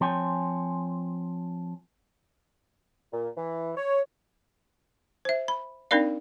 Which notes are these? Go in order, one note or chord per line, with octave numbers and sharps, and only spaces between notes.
F3 C4 C#5 G5 G#5
A#2
E3
C#5
C5 E5
B5
C4 D4 D#4 A#4 D5 F5